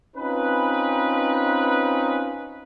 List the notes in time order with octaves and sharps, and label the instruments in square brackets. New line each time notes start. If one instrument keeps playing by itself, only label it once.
[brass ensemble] C4 C#4 D#4 F4 B4